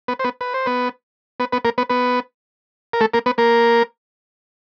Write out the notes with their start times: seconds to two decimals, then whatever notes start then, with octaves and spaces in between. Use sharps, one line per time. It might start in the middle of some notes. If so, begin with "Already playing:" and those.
0.08 B3 B4
0.19 C5
0.24 B3 B4
0.41 B4
0.54 C5
0.66 B3 B4
1.40 B3 B4
1.52 B3 B4
1.65 A#3 A#4
1.78 B3 B4
1.90 B3 B4
2.93 A#4
3.01 A3 A4
3.14 A#3 A#4
3.26 B3 B4
3.38 A#3 A#4